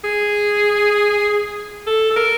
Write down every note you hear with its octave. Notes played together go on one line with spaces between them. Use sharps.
G#4
A4
A4
A#4